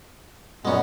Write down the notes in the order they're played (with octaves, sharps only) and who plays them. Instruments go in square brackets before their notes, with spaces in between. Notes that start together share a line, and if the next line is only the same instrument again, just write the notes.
[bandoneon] F#2 A#2 B3 [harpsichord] G#3 C#4